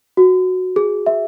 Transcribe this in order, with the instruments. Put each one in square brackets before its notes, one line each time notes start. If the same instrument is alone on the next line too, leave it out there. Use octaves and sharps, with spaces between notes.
[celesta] F#4
G#4
E5